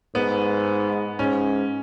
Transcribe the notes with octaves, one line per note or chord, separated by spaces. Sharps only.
G#2 B3
G#2 C#4